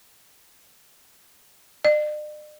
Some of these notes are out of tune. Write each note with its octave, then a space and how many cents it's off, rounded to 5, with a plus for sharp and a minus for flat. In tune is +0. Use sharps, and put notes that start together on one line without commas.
D5 +45